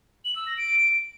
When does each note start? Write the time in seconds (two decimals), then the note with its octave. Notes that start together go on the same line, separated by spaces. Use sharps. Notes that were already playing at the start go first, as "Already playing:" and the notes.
0.25 F#7
0.36 E6
0.47 A#6
0.58 D7